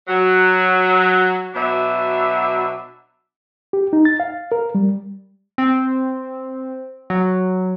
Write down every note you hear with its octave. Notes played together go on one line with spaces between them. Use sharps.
F#3
B2 F#3 D4 E5
G4
D#4
A6
F5
A#4
G3
C4
F#3